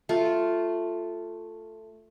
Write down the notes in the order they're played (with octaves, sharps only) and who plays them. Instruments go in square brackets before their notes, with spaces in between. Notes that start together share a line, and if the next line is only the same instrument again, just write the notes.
[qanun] A3 F4